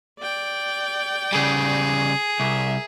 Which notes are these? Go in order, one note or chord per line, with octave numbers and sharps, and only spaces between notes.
D5 G5
C#3 G3 G#4
C2 A#4 E5